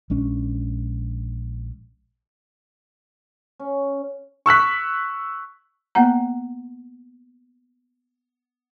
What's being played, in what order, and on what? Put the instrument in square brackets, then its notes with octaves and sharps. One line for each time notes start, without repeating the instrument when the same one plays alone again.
[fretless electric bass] A#1 G#3 C#4 D4
[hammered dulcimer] C#4
[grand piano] C#6 E6 F#6 B6
[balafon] A#3 B3 F#5 A#5